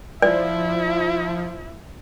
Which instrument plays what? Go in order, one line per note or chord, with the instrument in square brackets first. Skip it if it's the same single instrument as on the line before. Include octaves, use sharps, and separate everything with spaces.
[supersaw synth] F3 [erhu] E4 [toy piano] D5